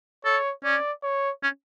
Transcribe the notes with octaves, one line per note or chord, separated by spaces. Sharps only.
A4 C#5
C#4 D5
C#5
C#4